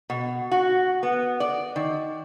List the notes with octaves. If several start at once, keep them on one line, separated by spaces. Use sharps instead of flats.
B2
F#4
B3
D5
D#3